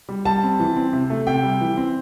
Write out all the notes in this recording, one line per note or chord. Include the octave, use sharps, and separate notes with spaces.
G3
G3 A5
C4
E3
C4
C3
A3
C3 G5
G3
E3
C4